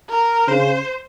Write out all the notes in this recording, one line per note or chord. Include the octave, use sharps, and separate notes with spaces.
A#4
C#3 C5